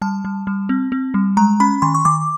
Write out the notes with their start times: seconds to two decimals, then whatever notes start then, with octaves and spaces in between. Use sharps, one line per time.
0.02 G3 A5
0.25 G3
0.47 G3
0.69 C4
0.92 C4
1.14 G3
1.37 G#3 A#5
1.60 C#4 B5
1.82 D#3 C6
1.95 C#6
2.05 D#3 D6